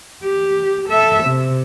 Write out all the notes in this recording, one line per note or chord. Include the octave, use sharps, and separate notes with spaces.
G4
A4 E5
C3